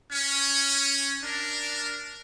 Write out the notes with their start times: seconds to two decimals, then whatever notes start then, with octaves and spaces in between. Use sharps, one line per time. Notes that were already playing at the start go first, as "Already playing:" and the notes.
0.12 C#4
1.23 D4 A#4